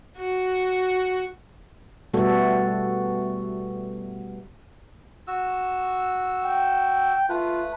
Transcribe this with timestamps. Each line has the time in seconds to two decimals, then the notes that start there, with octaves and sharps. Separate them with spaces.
0.18 F#4
2.14 B2 G3 A3 B3 F#4 A4
5.28 F#4 E6
6.45 G5
7.29 A3 F4 B4